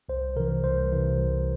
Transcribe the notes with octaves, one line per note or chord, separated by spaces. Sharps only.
C2 C5
C3 E3 A#4
C2 C5
C3 E3
C2